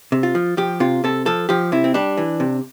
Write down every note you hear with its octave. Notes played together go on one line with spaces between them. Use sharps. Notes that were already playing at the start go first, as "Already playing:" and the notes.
C3
F4
F3
F3 G4
C3 F4
C3 A4
F3 A4
F3 G4
C3 E4
C4
G3 D4
E3
C3